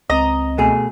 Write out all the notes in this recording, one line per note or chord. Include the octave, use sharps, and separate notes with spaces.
C#2 C4 D#5 A#5
B2 A3 G#4